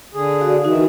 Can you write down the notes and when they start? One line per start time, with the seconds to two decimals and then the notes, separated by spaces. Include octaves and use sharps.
0.14 D3 G#4
0.40 F#4 D5 F5
0.64 D#3 E3 D#4 F#4